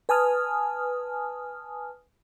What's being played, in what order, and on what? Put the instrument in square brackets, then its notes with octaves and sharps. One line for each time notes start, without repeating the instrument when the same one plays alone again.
[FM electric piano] B4 G#5 A5 D#6 F6